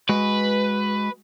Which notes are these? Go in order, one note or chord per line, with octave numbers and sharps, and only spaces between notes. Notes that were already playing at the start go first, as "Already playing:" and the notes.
G#3 F#4 B4